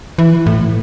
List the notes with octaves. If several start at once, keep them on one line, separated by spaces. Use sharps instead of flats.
E3
A2